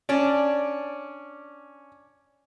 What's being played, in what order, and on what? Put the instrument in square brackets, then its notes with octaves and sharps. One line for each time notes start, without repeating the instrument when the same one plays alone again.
[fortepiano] C#4 [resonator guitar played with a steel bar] D4 D5